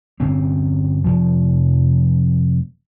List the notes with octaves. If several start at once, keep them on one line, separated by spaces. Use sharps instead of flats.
G1 D3 C4 C#4
F1 F3